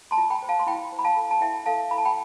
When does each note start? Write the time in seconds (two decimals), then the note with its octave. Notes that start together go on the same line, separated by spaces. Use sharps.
0.11 A5 C6
0.18 F4
0.30 G5 B5
0.42 C5
0.49 F5 A5
0.59 C6
0.67 E4 G5 B5
0.92 C5
0.99 B5
1.04 F5 A5
1.16 A4
1.31 A5
1.41 E4 E5 G5
1.66 A4 F5 A5
1.91 E4 B5
1.98 A5
2.05 G5 B5